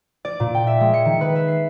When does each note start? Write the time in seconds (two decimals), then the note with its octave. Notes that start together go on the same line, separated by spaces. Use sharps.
0.25 D5
0.40 A#2
0.55 G5
0.67 E5
0.80 G#3
0.94 C#7
1.05 D#3
1.21 B4
1.35 E5
1.48 C7